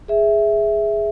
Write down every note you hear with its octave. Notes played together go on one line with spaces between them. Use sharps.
G#4 E5